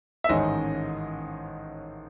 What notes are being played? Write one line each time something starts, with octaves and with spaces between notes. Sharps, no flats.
E5
A1 G#2 D#3 G#3 C#4 D#5